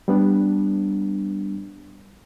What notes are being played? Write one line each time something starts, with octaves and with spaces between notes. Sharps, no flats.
G3 B3 D4